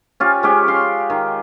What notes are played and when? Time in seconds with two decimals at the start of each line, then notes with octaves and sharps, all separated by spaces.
0.20 C#4 F4 G4
0.43 G#3 C#4 G4
0.68 F5 C6
1.10 D#3